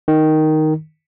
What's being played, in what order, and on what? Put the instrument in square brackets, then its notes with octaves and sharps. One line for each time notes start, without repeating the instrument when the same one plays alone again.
[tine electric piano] D#3